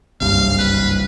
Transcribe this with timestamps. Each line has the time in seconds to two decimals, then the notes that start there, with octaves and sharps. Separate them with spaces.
0.20 F#1 C2 G2 F5
0.58 B4